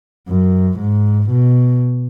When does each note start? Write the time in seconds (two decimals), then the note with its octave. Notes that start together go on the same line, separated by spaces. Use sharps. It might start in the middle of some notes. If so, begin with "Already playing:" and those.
0.29 F#2
0.80 G#2
1.30 B2